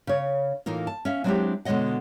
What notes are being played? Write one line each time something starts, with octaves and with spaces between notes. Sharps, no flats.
C#3 C#5
A2 E3 A#3 D#4 F4
A5
C#4 E5 F5
F#3 G#3 C4 D4 E4 G4
B2 D3 G#3 C#5 D#5 F#5